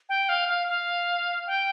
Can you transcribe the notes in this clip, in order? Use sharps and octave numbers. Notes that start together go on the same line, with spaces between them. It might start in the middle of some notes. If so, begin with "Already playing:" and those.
G5
F5
F5
F5
G5